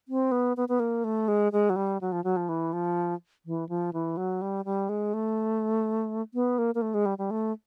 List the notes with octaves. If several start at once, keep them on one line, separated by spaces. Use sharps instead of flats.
C4
B3
B3
B3
A#3
A3
G#3
G#3
F#3
G3
F#3
F3
F#3
F3
E3
F3
E3
F3
E3
F#3
G3
G3
G#3
A3
B3
A#3
A#3
A3
G#3
G3
G3
A3